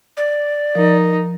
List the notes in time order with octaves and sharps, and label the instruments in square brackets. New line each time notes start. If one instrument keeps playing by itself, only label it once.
[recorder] D5
[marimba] F3 [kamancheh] D#4 [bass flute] A#4